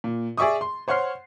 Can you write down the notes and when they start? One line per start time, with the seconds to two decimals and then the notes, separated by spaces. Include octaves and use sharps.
0.04 A#2
0.38 G#4 D5 E5 C#6 D#6
0.61 C6
0.88 C5 C#5 F#5 C6 F6 C7